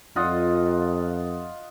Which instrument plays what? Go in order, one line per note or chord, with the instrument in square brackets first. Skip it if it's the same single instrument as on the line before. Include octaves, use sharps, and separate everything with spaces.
[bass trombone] F2 [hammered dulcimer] F4 D#5 F#5